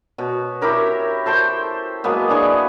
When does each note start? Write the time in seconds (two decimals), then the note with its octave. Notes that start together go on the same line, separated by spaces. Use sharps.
0.18 B2 C#5
0.61 E4 G4 A#4 C#5
1.26 A4 C5 G5 C#6
2.04 F#3 G#3 A#3 B3
2.29 D4 E4 G#4 C#6